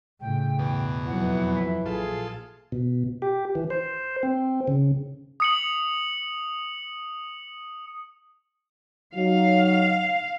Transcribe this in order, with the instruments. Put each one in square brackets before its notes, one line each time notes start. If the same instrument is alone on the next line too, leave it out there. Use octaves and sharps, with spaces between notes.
[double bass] A2 C#3 [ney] G5
[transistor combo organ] E2 B2
[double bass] F2 F#3 [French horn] E3 [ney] F#5
[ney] E5
[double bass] A#1 [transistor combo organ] F4 A4 [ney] G#4
[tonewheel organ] B2
G4
E3
C5
C4
C#3
[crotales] D#6 C#7 F#7
[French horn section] F#3 D#4 [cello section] F5